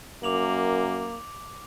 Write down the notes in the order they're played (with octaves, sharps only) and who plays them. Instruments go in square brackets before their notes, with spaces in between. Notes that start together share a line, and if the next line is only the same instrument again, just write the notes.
[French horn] F#2 [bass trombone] A#3 [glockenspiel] D6 F7 F#7